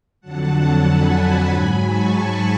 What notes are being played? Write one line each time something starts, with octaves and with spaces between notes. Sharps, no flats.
F2 D3 F#3 F#5 A5
G#5 B5
G#2 F#3
A5 C#6